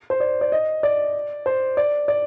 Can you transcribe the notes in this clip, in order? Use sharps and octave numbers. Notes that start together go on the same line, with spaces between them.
C5
D5
D5
D#5
D5
C5
D5
D5